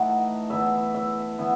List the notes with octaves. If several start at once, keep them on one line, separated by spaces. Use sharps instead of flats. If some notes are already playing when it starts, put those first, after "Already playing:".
Already playing: E3 A3 D#4 F#5
E3 B3 E4 E5
E5
E3 B3 E4